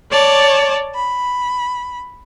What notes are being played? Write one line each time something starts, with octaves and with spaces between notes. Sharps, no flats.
C#5 D5 A5 D6
B5